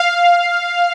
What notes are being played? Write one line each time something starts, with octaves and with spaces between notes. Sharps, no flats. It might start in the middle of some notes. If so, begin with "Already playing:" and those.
Already playing: F5